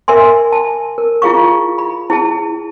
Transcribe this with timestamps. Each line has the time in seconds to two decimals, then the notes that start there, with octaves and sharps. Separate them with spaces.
0.08 A#4 E5 G#5 C6
0.52 A5
0.98 A#4
1.22 E4 F4 G#4 F5 C#6
1.78 B5
2.10 E4 G#4 A5